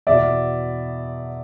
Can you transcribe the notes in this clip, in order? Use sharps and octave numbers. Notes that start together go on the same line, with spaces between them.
E2 B2 D5 E5